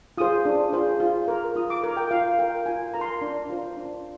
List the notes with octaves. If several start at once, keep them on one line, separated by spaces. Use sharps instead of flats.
F4 G#4 C5 D#6
D4
F4 G#4 C5
F4
A#4
F4 D#6
D6
A#4
G5
F4 F5
A#4 G5
F4 G#5
A#4 A#5
C6
A#5
D4
F4 C5
D4